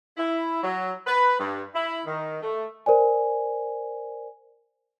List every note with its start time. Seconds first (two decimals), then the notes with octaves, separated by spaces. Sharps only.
0.17 E4
0.63 F#3
1.07 B4
1.39 G2
1.75 E4
2.06 D#3
2.42 A3
2.86 A#4 C5 D5 G#5